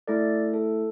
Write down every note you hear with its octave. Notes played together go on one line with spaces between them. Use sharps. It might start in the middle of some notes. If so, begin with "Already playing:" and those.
A3 E4 A4 D5
A4